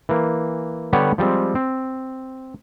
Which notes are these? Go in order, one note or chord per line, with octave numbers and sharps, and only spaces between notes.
E3 A#3
D3 G3 B3 G4 C#5 F#5
F3 G3 G#3 C4
C4